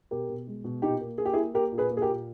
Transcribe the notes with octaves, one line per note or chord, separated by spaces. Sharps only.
B2 G4 A#4
B2
G#3
B2
A#2 D#4 G4
A#3
A#3 G#4
G4
E4 G#4
A#3
A#3 G4 A#4
A#2
G#4 B4
A#3
G#4
G4 A#4
A#2